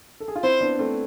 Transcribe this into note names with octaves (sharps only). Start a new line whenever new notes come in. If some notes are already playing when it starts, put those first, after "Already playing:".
A4
G#4
F4
C4 E4 C5
B3 D4
A3 C4